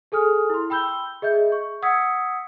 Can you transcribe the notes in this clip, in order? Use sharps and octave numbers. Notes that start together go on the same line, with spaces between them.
G#4 A4 G#5 D#6 F6
E4 C6
G5 B5 E6 G6 G7
G#4 D#5 E5 G6
C#6
F#5 D#6 E6 G#6 B6 C#7